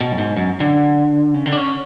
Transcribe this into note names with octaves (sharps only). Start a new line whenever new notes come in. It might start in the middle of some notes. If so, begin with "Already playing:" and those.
B2
F#2
G#2
F#2
D3
C#3
D3
D4
C#4